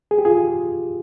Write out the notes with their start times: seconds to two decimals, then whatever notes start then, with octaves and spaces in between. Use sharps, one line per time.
0.11 G#4
0.18 G4
0.25 F4 G#4